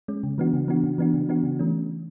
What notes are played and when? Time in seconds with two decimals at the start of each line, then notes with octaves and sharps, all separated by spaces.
0.08 G#3 C#4
0.23 C#3
0.38 E3 B3 D4 F#4
0.53 C#3
0.68 E3 B3 D4 F#4
0.84 C#3
0.98 E3 B3 D4 F#4
1.14 C#3
1.29 E3 B3 D4 F#4
1.43 C#3
1.59 E3 A3 C#4